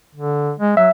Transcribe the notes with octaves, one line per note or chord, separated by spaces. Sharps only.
D3
G#3
F#3 E5